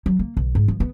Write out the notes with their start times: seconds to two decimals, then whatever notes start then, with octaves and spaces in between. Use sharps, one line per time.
0.06 F#3
0.19 A#3
0.37 B1
0.55 G#2
0.68 F3
0.80 B3